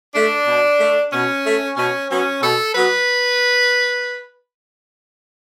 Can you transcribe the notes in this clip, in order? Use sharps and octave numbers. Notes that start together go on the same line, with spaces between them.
A3 D4
B2
A3
B2 C#4
A3
B2 C#4
F#3 B3 C#4
B2 A4
F#3 B3 B4